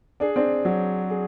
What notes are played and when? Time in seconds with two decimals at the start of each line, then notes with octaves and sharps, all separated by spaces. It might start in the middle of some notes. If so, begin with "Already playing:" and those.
0.20 D4 G#4
0.36 C4 D4
0.65 F#3
1.10 G#4